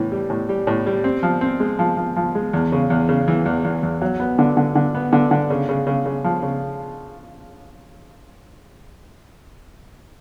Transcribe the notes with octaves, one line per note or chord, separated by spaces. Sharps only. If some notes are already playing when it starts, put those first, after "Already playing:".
Already playing: A2 E3
G3
A2
G3
A2
G3
C4
F3
C4
G#3
F3
F3
F3
G#3
E2
C#3
E2
C#3
E3
E2
E2
E2
F#3
B3
D3
D3
D3
B3
D3
D3
C#3
C#3
C#3
C#3
F3
C#3